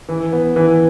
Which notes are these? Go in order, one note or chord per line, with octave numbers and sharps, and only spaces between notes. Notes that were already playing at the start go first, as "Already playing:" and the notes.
E3
B3
E3